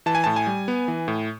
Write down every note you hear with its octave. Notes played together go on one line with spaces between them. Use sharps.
E3 A5
G#5
A2 A5
G#5
G3
B3
E3
A2